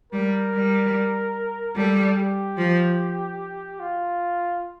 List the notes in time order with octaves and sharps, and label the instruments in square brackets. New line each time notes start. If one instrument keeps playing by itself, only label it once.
[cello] G3 [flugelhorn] A#4
[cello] G3
[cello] G3 [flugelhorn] A4
[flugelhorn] G4
[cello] F3
[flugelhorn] F4